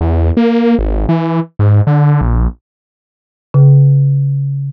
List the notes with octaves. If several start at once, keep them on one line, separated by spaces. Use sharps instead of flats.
E2
A#3
G#1
E3
G#2
D3
A#1
C#3